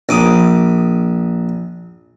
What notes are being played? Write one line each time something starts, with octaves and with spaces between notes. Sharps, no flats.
A#1 D6 D#6